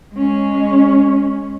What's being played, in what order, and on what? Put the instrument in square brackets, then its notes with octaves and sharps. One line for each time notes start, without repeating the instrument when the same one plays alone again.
[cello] G#3 C#4